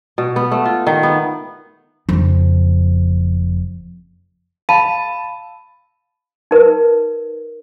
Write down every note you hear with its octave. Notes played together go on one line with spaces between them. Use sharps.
B2
B3
A3
F4
D#3
B3
F#1 F2
F5 A5 B5 D#7
D#4 A#4 B4